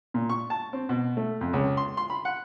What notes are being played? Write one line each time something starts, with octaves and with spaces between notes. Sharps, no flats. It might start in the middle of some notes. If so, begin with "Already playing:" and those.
A#2
C#6
A5
C4
B2
A3
F2
C#2
C6
C6
B5
F#5